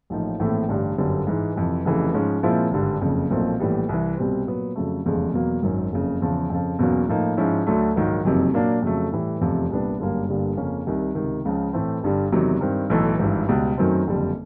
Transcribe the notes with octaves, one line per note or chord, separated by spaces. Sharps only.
A1 A2 F3 A#3 D#4
A#1 A2 E3 A3 C4
A1 G2 D3 G3
G1 F#2 D3 G3 B3
G#2 E3 G#3
F2 C3 E3
F1 F2 C#3 E3
G#2 F3 G#3 C#4
A#2 F3 G#3 C4 E4
G#1 G2 D3 G3
F#1 F2 C#3
B1 A#2 F3 A3 C4
A#1 A2 E3 G3 B3
C2 C3 E3
C2 B2 G3 C4
A#2 F#3 B3
F2 C#3 F#3 A3
F1 E2 C#3 F3 G#3
E2 B2 F#3 A#3
G#1 F#2 D#3 F#3
F#1 F2 C#3
E2 C#3 F3
F2 C#3 F3
E2 B2 F#3 A#3 C#4
A2 F3 A#3 D#4
G#2 F3 G#3 C#4 E4
D2 D3 F#3 A3
A#1 G#2 D#3 F#3 A#3
F#1 F2 C3 D#3 F#3
A#2 F#3 A#3 D4
F2 C#3 F#3 A3
A2 E3 G3
F1 E2 C3 F3
C2 A#2 G3 B3 D4
G1 F#2 D3 G3 A#3
G1 G2 D3 G3 A#3
F2 C#3 F3 A#3 C#4
C2 C3 D#3 G3
C#2 C3 D#3
C#2 C#3 F3
A2 E3 A3 C4
G1 G2 D3 G3
E1 E2 C3 D#3 F#3
G2 D#3 G3 C4
B1 A2 E3 A3
G#1 G2 E3
C#2 B2 G3
F#2 D#3 F#3 A3 C4
F#1 F2 D3 G3